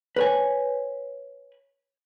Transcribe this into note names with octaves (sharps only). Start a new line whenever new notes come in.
B4 C#5 G#5